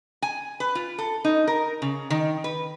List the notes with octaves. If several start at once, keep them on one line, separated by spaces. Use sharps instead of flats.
G#5
B4
F4
A4
D#4
A#4
C#3
D#3
B4